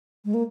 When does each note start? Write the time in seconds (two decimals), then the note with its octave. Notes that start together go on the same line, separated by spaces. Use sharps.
0.25 G#3
0.34 A#3